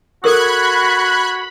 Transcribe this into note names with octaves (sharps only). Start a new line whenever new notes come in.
F#4 A4 A#4 B5 E6 F#6 G#6